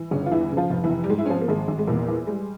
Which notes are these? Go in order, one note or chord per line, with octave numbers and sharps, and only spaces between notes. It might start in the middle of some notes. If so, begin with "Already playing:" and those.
Already playing: E3
G1 C#3 C#4
F4
E2 E3 E4
C#3
F3 F4
F1
E3 E4
F1
G3
G#2 G#3
E4
C#4
F3 C4
A#3
G#1 G#3
G#1
G#3
E2 A#2 A#3
E3
G3 G#3